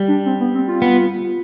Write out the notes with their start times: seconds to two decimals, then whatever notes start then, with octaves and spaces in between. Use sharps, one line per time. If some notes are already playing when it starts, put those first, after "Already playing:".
Already playing: G3
0.08 D4
0.26 C4
0.40 B3
0.55 C4
0.68 F4
0.82 B3